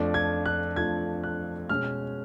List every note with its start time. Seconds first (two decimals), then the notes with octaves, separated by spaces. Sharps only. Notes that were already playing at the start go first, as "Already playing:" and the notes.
Already playing: F2 F3 A3 D4
0.14 G#6
0.46 F#6
0.76 F2 F3 A3 D4 G#6
1.24 F#6
1.69 B2 G#3 C#4 F6